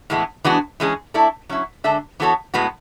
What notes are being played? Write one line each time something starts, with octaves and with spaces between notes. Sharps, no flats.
A2 E3 G#3 B3
E3 G#3 B3 D4 F#4
E3 G#3 C#4 G#4
A3 E4 A4 D5
F#3 C#4 E4
D3 G#3 D4 A4 E5
E3 B3 F#4 A4 C#5
A2 G#3 B3 F#4 B4